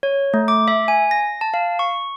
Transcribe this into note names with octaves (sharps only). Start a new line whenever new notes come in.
C#5
A3
D6
E5
G#5
A#6
A5
F5
C#6